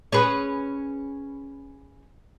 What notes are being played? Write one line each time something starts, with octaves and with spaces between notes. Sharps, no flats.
C#4 G#4 B4